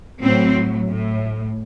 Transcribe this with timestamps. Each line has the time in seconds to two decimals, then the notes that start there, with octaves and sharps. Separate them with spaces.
0.21 A2 F#3 C4
0.88 A2